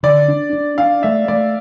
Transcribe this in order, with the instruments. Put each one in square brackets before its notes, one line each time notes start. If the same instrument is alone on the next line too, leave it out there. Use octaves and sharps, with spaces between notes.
[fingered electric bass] D3 [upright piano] D5
[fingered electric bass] D4
D4
[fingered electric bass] D4 [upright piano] F5
[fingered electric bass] A3 [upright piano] E5
[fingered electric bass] A3 [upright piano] D5